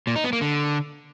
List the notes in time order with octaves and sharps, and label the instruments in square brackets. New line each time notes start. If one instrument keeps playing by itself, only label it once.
[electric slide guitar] A#2
D#4
B3
A#3
D3